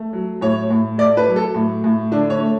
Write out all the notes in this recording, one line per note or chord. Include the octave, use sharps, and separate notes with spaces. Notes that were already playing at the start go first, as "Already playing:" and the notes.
Already playing: A3
F#3
A2 C#5
A2
A3 D5
B4
F#3
A4
A2
A2
D3 D4
C#5
A3